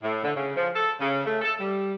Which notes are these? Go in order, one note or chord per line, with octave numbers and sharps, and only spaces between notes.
A2
D3
C#3
F3
A4
C#3
A3
A4
G3